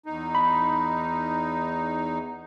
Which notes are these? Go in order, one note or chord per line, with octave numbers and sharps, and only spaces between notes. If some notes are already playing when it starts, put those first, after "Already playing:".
E2 D#4
B5